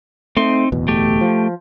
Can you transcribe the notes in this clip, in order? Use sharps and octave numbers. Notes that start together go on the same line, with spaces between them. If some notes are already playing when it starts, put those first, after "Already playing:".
A3 C4 D#4 C6
D1 E2 B2
A3 G4
F3